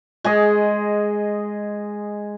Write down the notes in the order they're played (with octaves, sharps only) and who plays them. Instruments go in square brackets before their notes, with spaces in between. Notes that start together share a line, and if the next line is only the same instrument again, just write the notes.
[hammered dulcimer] G#3 G#4 D#5